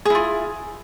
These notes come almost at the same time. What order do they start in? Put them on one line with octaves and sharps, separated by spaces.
G#4 E4 F4